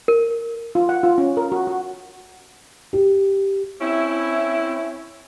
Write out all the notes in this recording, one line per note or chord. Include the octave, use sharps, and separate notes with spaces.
A#4
F4
F#5
F4
C#4
A#4
F#4
F#4
G4
C4 C#4 E4